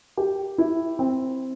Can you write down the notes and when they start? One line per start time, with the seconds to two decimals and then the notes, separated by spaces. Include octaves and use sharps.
0.17 G4
0.58 E4
0.99 C4